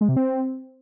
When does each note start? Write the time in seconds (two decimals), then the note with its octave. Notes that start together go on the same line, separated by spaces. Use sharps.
0.01 G#3
0.09 C3
0.16 C4